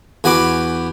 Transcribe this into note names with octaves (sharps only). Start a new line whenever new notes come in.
E2 F#4 G#5 B5 D6